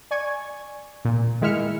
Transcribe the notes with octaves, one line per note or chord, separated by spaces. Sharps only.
D5 G#5 C#6 G#6
A#2
D#3 G#3 E4 E5 F6 C#7